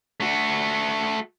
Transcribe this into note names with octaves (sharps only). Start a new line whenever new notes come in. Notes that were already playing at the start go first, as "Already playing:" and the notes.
A3 F#4